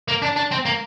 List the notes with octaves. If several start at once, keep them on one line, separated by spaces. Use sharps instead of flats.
A#3
D4
D4
C4
A#3